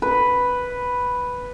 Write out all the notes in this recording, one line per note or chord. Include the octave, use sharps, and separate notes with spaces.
B4